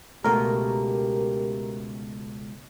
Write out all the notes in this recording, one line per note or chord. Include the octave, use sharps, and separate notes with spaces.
C#2 B2 A3 G4 A#4